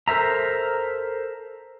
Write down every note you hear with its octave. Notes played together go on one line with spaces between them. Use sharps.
A4 A#4 C5 E5 A#5